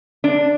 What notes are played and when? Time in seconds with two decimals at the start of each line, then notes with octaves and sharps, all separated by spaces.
0.24 D4